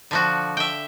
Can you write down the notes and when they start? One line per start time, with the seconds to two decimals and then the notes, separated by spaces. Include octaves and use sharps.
0.11 D3 F3 F#4
0.57 E5 G5